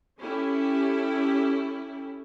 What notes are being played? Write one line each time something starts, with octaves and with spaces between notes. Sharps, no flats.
C#4 E4 G4 A4